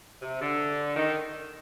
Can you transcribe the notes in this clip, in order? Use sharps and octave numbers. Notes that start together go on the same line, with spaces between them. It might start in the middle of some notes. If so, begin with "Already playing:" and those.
C3
D3
D#3